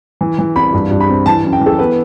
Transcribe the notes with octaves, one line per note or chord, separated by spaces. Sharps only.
E3
E3
C2 B5
G2
G2
B5
C4
E3 A5
F#2
G5
E3
A4
B3 B4